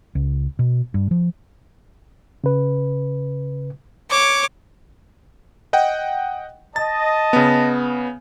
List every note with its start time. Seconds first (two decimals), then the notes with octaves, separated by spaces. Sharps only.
0.15 C#2
0.59 B2
0.94 G2
1.11 F3
2.44 C#3 B4
4.11 C#5 D6
5.73 D#5 F#5 G5
6.76 D#5 A5 A6
7.33 C#3 B3